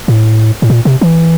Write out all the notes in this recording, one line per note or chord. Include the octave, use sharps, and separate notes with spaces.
A2
A2
A#2
C3
E3